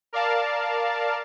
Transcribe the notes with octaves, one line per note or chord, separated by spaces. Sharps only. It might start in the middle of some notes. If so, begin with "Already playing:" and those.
A#4 D5 F5 A5